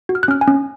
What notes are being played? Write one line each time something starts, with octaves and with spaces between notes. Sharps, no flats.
F#4
F6
F#6
C#4 F6
G#5
C#4